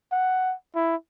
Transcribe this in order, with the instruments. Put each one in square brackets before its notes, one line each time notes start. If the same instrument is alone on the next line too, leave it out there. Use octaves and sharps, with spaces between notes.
[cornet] F#5
E4